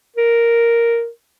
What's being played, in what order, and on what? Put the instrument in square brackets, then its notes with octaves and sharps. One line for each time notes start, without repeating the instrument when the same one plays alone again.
[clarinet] A#4